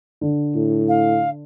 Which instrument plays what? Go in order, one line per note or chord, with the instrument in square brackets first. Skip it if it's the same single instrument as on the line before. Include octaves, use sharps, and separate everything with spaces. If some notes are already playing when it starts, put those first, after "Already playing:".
[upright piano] D3
[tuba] A2
[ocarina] F5